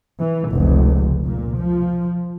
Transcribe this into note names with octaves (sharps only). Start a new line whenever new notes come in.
E3
F1 C#2
A#2
F3